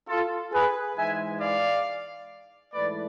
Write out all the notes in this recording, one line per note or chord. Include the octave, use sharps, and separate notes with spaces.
F4 A4
G#4 B4
G#2 E3 G#3 E5 G#5
D5 F5
G#2 E3 A3 B4 D5